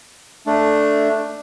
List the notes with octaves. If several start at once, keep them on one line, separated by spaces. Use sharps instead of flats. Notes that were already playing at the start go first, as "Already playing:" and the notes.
A3 D4